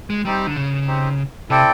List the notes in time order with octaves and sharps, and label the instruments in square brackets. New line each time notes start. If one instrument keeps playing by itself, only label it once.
[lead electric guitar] G#3
[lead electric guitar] G3 [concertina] C4 D#4 G4 C5
[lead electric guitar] D3
C#3
[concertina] C4 D#4 G4 C5
[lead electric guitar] C3 [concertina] C4 E4 A4 D5 G5